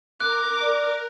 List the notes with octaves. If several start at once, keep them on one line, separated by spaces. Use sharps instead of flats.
A#4 D6 F#6
D5